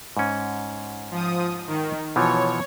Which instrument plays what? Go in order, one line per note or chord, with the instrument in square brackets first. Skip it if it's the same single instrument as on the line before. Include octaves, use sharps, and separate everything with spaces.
[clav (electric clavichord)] G#2 C#4
[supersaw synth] F3 D#6
D#3
[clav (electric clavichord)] B2 E3 F3 [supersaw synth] C#5